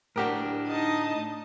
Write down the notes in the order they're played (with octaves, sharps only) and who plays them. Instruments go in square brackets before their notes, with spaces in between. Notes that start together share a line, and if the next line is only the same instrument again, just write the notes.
[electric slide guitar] A2 D4 [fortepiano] F#4 G4 A#4
[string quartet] D#4 D#5 A5